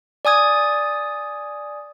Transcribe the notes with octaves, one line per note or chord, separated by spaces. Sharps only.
D5 G#5 D#6 G#6